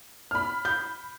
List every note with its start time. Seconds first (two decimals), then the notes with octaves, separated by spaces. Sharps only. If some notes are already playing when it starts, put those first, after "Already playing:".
0.31 B5 F6
0.65 G6